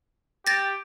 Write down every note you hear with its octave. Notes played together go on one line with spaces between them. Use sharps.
G4 A6 A#6